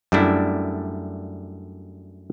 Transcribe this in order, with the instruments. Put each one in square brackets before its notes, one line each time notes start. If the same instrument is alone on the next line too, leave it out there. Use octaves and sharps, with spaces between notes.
[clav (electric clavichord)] F#2 G3 A3 D4 E4